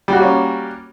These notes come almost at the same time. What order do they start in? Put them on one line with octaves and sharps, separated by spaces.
G3 F#4 A#3 C#4